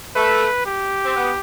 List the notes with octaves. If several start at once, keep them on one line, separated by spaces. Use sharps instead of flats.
A3 B4
G4
C4
B3